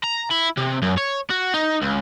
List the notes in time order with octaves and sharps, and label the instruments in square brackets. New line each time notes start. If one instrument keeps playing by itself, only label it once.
[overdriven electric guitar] A#5
E4
C3
F#2
C#5
F#4
D#4
C#2